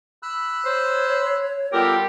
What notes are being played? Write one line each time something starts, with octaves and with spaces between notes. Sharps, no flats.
B5 E6 F#6
C5 C#5
G3 B3 F4 G4 A4 A#4